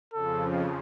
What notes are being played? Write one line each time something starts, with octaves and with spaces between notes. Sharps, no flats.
F2 C#3 F3 A4